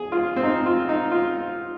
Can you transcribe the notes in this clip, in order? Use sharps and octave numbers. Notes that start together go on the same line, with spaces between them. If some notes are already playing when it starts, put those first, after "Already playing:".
Already playing: G#4
F4
C4
D#4
F4
D#4
F4